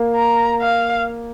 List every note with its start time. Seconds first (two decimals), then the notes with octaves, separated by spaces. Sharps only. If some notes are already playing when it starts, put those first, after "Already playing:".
Already playing: A#3
0.15 A#5
0.61 F5